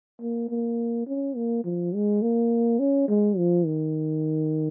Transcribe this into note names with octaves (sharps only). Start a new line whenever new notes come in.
A#3
A#3
C#4
A#3
F3
G#3
A#3
C#4
G#3
F3
D#3